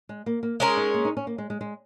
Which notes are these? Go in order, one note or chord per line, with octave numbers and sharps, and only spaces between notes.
G#3
A#3
A#3
G#3 C#4 A#4
D#4
A#3
D#4
C#4
A#3
G#3
G#3
G#3